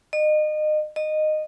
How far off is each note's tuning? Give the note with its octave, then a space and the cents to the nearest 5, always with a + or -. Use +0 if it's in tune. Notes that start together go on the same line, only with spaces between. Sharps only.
D#5 -30
D#5 -15